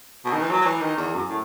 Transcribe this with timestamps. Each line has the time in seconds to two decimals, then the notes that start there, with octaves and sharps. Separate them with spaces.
0.25 B2
0.33 D#3
0.41 E3
0.50 F#3
0.61 F#3
0.65 E3
0.81 D#3
0.97 E2
1.14 F#2
1.29 A2